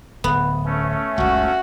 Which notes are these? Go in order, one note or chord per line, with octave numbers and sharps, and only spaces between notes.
D1 B3
A3 C#4
F#1 C#2 F#4